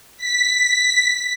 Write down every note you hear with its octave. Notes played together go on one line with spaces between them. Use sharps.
B6